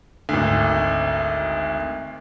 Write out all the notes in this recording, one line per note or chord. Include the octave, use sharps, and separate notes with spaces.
G#1 D2